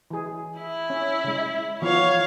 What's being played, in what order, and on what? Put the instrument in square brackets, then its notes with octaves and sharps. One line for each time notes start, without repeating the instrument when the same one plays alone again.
[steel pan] E3 G#4
[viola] E4
[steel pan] C#4
C#3 G#3
[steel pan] E3 F3 B3 [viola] C#5 F5